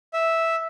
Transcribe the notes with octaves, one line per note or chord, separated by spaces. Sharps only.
E5